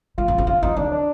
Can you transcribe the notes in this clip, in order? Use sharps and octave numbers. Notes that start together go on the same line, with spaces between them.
A3 F4
A#3
C4
D4 F4
C4 D#4
D#3 D4
D4